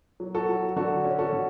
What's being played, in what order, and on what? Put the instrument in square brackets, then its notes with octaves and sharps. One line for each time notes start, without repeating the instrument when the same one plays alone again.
[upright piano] F#3
F#4 A4
F#3
D3 F#4 A4
C#4
F#4 A4
D3